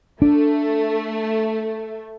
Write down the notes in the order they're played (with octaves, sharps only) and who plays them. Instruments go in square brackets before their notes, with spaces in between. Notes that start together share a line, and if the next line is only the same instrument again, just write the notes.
[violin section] A3 [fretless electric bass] D4